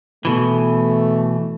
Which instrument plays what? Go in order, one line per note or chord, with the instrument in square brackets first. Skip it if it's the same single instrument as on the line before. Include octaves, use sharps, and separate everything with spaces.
[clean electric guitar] B2 E3 [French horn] A3